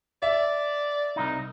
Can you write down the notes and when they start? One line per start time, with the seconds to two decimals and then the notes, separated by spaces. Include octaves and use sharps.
0.22 D5 E5
1.16 C2 D#4